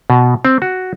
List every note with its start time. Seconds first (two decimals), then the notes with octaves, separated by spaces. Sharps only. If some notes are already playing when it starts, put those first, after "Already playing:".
0.10 B2
0.45 C4
0.62 F#4